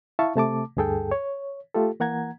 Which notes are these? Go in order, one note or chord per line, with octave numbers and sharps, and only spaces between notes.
E4 E5 F5 A5 C#6
C3 A3 A5 D6
D2 G2 G#4 A4 G5
C#5
A3 F4 G4 A4
E3 A#3 F#5 A#5 G#6